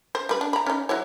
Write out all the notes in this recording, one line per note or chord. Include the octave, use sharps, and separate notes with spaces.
C5
G3 B4
D4
A#5 B5
C#4 D#4
F#3 E4 C#5